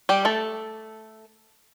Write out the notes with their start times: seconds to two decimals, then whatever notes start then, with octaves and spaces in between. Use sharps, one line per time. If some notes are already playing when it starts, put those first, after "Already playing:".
0.09 G3 G4
0.25 A3 A4